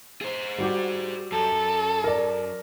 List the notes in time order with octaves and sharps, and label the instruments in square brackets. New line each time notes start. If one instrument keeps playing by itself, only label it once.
[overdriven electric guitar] G#4 C5
[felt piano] G3 F#4 G4
[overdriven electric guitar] F#2 [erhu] A4
[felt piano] A#4 D5